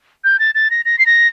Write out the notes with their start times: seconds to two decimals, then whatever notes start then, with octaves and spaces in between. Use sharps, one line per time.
0.24 G6
0.39 A6
0.55 A6
0.71 A#6
0.85 A#6
0.99 C7
1.06 A#6